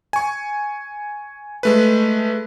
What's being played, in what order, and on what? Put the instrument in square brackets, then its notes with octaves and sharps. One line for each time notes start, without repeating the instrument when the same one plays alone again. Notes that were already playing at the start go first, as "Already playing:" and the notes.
[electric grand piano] G#5 C#6
G#3 A3 B4